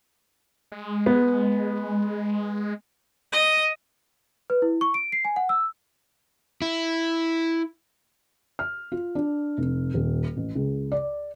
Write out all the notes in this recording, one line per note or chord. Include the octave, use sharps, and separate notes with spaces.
G#3
B3
D#5
B4
E4
C#6
D7
C7
G#5
F#5
E6
E4
F6
F4
D4
F1
D#1
A1
C#2
D5